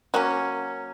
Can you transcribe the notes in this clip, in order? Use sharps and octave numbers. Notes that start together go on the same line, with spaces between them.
F#3 A#3 C#4